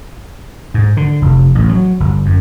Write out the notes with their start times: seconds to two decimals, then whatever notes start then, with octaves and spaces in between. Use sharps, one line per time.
0.74 G#2
0.97 D3
1.22 F1
1.55 A1
1.69 F#3
2.00 G1
2.26 F#2